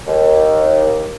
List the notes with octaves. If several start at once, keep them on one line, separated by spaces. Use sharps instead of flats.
D#2